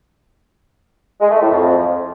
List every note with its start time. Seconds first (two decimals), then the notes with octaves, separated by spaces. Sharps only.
1.21 G#3
1.31 A3
1.41 A2
1.51 F2